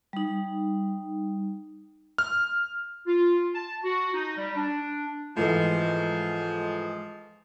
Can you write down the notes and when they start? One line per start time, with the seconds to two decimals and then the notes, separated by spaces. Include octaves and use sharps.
0.13 G3 D#4
2.18 F6
3.07 F4
3.54 A5
3.84 F#4
4.14 D#4
4.37 G3
4.56 D4
5.37 G#2 E3 F3 G#3 A3